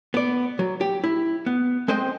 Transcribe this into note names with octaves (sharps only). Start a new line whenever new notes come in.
B3 D5
F#3
G4
E4
B3
G#3 C4 C5 D#5 G5